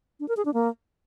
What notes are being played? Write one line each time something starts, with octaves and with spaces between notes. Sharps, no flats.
D4
A#4
G#4
D4
A#3